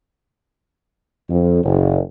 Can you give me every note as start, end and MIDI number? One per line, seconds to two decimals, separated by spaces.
1.29 1.59 41
1.63 1.99 30